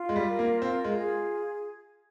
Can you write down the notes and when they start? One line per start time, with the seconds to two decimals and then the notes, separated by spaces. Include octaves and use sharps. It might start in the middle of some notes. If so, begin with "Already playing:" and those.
Already playing: F4
0.09 G#3
0.16 G3
0.28 A#4
0.39 A#3
0.62 C4 F4
0.84 G#3
0.96 G#4